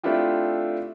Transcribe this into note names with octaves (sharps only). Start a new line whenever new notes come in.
A3 C4 D4 E4 F4 G4